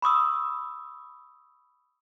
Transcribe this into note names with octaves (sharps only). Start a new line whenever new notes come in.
B5 C#6 D#6 E6